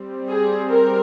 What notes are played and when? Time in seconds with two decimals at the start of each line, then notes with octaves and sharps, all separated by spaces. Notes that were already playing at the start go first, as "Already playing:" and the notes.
Already playing: G3 C4
0.30 G#4
0.70 A#4